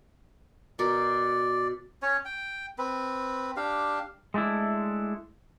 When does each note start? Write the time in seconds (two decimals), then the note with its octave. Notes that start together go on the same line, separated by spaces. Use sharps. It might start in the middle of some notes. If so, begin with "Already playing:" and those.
0.79 B2 A#4 D5
2.02 C#4 C#5
2.25 G5
2.78 C4 B4
3.56 D4 G4 F5
4.34 G#3 A3 D4 E4